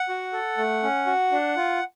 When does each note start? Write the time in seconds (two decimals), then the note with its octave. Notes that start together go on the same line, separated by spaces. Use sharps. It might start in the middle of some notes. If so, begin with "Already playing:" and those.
Already playing: F#5
0.09 F#4
0.33 A4
0.58 A3
0.83 C#4
1.06 F#4
1.32 D4
1.57 F4